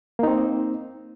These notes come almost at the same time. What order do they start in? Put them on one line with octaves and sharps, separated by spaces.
A#3 D#4 C4